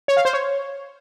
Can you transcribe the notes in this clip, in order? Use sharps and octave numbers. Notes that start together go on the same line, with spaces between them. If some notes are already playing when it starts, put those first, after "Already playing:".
C#5
F5
C5
C#5